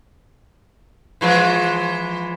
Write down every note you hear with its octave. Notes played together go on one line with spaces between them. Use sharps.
E3 F3 G#3